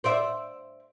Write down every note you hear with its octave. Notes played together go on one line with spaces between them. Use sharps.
C5 D5 E5